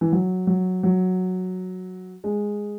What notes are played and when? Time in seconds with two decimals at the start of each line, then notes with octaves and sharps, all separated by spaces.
0.01 E3
0.12 F#3
0.47 F#3
0.83 F#3
2.24 G#3